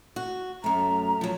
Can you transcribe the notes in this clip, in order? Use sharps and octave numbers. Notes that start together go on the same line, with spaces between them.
F#4
F#2 A3 A#5
F3 F#3